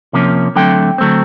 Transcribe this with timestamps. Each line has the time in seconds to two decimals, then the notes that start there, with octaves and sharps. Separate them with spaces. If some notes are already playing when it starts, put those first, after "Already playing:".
0.13 C3 F3 A#3 C#4
0.56 D3 F#3 A3 C4 G5
0.98 D3 F#3 A3 C4